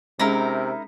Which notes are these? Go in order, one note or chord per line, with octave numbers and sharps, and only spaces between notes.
C3 G#3 C#4 D#4 E4 G#4 A#4